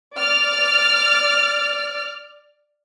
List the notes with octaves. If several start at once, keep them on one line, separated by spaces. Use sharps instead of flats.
D5 F6